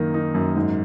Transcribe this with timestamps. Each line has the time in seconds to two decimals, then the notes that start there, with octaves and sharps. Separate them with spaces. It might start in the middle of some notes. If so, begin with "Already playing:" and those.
Already playing: F#2 D#3 A#3 D#4
0.14 D#4
0.34 F#2
0.57 G#2